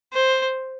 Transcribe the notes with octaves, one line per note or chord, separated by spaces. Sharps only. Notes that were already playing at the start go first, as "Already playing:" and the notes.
C5